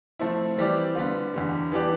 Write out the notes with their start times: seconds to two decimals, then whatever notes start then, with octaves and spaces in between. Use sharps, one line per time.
0.19 F3 A3 C4 E4
0.57 E3 G3 C4 G4 D5
0.95 D3 G3 B3 F4
1.34 E2 D3 G3
1.72 E3 B3 D4 G4 D5